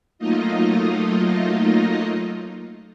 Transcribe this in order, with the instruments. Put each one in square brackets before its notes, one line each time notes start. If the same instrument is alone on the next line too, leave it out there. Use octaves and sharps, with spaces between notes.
[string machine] F#3 A3 A#3 D#4 F4 D#5